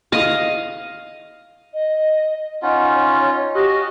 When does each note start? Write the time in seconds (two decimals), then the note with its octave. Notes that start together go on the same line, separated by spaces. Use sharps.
0.12 D#5 F5
1.74 D#5
2.62 C#4 D#4 F4 F#5
2.94 C#5
3.55 F#4 G4 D#5